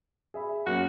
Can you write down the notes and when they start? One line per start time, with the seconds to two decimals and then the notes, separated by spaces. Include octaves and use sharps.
0.34 G#4 E5 B5
0.66 F#2 A#3 C#4 F#4